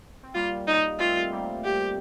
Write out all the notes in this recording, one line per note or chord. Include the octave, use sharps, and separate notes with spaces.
C4
G3 A#3 F4
D#4
A3 C4 F4
G3 A#3
G4